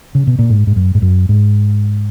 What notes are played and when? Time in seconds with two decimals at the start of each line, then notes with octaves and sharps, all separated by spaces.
0.15 C#3
0.27 B2
0.39 A#2
0.50 G#2
0.67 G#2
0.76 F#2
0.95 G#2
1.02 F#2
1.29 G#2